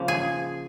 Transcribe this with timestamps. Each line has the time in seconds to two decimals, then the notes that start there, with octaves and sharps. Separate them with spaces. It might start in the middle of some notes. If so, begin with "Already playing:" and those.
Already playing: C#3 F3 A#3
0.08 G#4 G#5